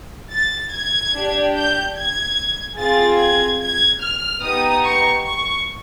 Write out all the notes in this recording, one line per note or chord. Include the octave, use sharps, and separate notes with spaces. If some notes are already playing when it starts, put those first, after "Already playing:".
A6
G#6
D4 G4
G6
G#6
C4 F4 G#4 A6
G#6
G#6
F6
B3 D#4 G4 D#6
C#6
C#6